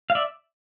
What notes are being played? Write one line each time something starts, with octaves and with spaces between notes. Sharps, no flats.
F5
D5 E5